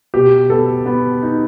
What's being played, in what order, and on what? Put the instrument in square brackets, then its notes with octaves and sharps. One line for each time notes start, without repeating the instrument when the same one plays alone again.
[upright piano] B2 [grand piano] G4
[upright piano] B3 [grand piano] A4
[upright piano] B3
D#4